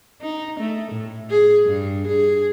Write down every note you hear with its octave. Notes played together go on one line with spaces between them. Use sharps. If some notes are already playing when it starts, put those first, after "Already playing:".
D#4
A3
A2
G#4
G2
G#4